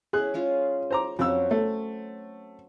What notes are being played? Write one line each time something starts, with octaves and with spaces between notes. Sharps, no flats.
C#4 E4 G#4 F#6
G#3 C#4 F4
C5 A#5 D6
F2 F#3 C4 C#4 E6
A3